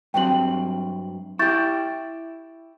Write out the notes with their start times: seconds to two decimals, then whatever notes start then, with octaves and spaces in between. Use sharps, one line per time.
0.14 G2 F#3 C4 G5 F#7
1.39 E4 G4 C#6 G6 A6